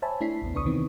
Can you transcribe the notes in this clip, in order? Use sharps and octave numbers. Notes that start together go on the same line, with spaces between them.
C5 C#5 E5 G#5 A5 B5
A3 D4 E4 B6 C7
A1 E2 B3
C#2 D4 B4 C#6 D#6
C3 D#3 E3 B3 C4